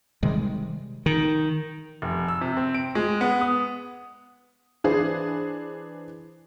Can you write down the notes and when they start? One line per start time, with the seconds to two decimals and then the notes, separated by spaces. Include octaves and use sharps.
0.23 C3 D#3 G3 G#3
1.06 D#3
2.02 F1
2.28 E6
2.41 C3
2.57 C4
2.74 D7
2.95 G#3
3.21 B3
3.41 D#6
4.84 E3 D4 G#4 B4 C5